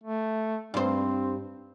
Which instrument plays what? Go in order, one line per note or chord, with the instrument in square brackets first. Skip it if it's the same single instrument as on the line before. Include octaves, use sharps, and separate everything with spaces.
[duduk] A3
[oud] G2 C5 [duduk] C4